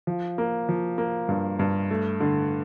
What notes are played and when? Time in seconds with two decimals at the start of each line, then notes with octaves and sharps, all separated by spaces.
0.07 F3
0.38 A#3
0.69 F3
0.98 A#3
1.29 G2
1.59 G2
1.91 A3
2.20 D3